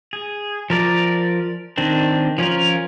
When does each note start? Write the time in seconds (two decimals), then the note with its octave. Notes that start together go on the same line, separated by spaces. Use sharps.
0.13 G#4
0.70 F3 A#4 D5
1.78 D#3 C4 D4
2.38 F3 C#4 F4 A#4